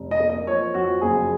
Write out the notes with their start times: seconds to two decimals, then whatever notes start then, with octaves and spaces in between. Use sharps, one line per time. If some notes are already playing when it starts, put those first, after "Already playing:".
Already playing: F1
0.11 D#5
0.20 A#3
0.30 D#5
0.47 F3 C#5
0.74 F2 F#4
1.01 F#1 G#4